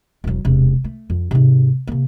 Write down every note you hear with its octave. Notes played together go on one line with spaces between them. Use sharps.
E1 F#3
E1 C3
A3
F2
G#2 C3
C3 A#3